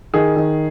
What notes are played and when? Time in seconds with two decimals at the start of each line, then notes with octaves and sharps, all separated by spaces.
0.14 D#3 G#4
0.36 D#3